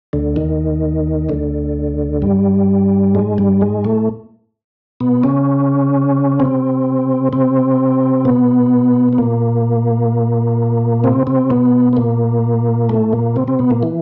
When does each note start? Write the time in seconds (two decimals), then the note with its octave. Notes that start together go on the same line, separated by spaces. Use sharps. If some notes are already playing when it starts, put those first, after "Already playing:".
0.13 D2 D3
0.36 D#2 D#3
1.29 D2 D3
2.22 G2 G3
3.15 G#2 G#3
3.38 G2 G3
3.61 G#2 G#3
3.84 A2 A3
5.00 B2 B3
5.23 C#3 C#4
6.40 C3 C4
7.33 C3 C4
8.25 B2 B3
9.13 B3
9.18 A#2 A#3
11.04 C3 C4
11.27 C3 C4
11.50 B2 B3
11.93 B3
11.97 A#2 A#3
12.89 A2 A3
13.13 A#2 A#3
13.36 C3 C4
13.48 C3 C4
13.59 B2 B3
13.70 A#2 A#3
13.83 E3